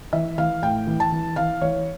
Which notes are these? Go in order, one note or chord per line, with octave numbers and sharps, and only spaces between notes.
E3 E5
E3 F5
A2 G5
E3
A5
E3
E3 F5
E3 C#5